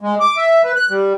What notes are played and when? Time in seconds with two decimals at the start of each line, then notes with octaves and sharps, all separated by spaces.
0.01 G#3
0.20 D6
0.37 E5
0.64 B4
0.76 F#6
0.90 G3